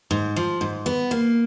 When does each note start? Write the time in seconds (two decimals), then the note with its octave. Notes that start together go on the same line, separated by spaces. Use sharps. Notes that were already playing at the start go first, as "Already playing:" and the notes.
0.11 G#2
0.36 F3
0.61 G#2
0.86 B3
1.11 A#3